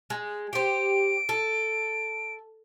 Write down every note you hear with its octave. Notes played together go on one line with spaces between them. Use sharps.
G#3
G4 C5 D7
A4